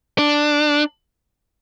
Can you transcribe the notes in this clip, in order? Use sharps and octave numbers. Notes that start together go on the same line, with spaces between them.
D4